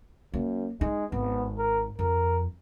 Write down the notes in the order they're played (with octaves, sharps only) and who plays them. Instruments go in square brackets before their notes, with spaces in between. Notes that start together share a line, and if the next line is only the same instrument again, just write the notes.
[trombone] F#2 [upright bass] A#3
[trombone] G#3 [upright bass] D#4
[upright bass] G#1 [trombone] B3
[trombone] A#4
[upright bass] F2 [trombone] A#4